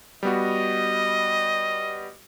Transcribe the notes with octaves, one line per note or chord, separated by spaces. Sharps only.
G3 B3 F#4 D#5